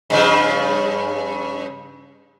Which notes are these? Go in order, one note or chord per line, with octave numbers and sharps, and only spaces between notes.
G2 C#3 F3